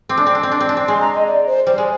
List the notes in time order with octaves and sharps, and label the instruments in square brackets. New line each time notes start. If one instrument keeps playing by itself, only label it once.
[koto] C4 [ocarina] D6
[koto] D4
C4
D4
C4
D4
C4
D4
C4
[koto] G#3 [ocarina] C6
[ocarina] A#5
D#5
D5
C5
[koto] G3 [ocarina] C5
[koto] G#3